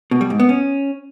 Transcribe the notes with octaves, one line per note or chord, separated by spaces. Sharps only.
B2
G3
G#2
B3
C#4